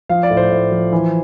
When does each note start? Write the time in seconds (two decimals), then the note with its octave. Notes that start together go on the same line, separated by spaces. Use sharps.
0.09 F3 F5
0.23 D5
0.30 A2
0.37 C5
0.51 A2
0.72 F3
0.92 E3